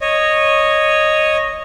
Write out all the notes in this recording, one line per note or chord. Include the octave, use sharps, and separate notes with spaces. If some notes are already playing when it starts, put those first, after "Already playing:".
C#5 D#5